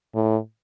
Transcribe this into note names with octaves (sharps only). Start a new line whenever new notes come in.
A2